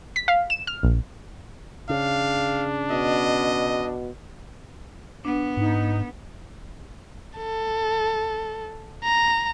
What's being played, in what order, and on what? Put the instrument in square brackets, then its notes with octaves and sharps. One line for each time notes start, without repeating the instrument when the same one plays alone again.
[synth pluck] B6
F5
E7
F6
A#1
[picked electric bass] C#3 [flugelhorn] D4 [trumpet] F5
[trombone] B2 [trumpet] D#5
[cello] B3 [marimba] D4
[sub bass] G#2 [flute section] D#4
[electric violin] A4
A#5